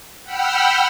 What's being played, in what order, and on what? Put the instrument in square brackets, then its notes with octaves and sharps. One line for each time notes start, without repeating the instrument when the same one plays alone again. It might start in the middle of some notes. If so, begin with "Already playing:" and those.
[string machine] F#5 G5 B5 E6 F6 G6